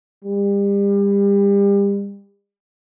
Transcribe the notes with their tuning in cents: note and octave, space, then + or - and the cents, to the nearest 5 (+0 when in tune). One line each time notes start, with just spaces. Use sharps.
G3 +35